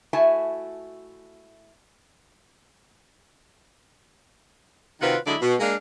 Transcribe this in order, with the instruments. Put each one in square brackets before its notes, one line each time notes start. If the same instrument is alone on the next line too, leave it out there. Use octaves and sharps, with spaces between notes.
[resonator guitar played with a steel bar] A3 E4 F#4 E5 G#5 A5
[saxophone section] C3 D#3 C4 F4 F#4 B4
D3 F#3 G#3 E4 D5 D#5
B2
G#3 A#3 D4 F5